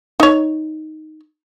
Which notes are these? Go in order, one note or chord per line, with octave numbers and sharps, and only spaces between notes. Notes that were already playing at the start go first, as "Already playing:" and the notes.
D#4 C#5